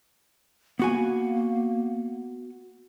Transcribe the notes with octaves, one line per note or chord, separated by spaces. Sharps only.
A#3 B3 F#4 G#5